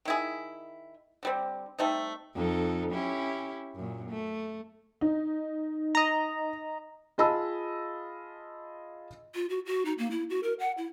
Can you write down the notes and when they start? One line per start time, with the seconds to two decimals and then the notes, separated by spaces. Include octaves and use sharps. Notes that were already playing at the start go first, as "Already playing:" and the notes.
0.05 D#3 E4 G#4
1.23 D3 G3 C4
1.79 G3 A3 C4 D#4
2.35 F2 D#4 A4
2.91 C#4 E4 G4
3.75 F#2 A#2
4.09 A3
5.01 D#4
5.95 D#5 A#5
7.18 F4 G#4 D#5 A5 B5 E6
9.35 F4
9.49 F#4
9.66 F#4
9.85 D#4
9.98 A#3
10.11 E4
10.30 F#4
10.43 A#4
10.59 F#5
10.77 E4